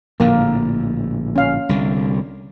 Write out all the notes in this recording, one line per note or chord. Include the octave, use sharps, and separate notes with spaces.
A#1 A2 D3 A#3
C#4 F5
C2 D3